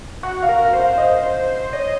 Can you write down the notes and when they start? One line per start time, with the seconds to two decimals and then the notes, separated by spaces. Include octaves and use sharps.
0.23 F#4 F#5
0.43 F5
0.49 A#4
0.73 C5
0.80 F5
0.98 D#5
1.73 C#5 D#5